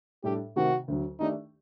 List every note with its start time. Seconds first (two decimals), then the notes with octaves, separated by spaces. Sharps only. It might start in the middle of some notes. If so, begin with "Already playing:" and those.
0.24 A2 G3 D4 G4 A4
0.56 C3 D#3 A3 C4 F#4 G4
0.88 D2 D3 F#3
1.20 D#3 A3 D4 D#4 G4 D5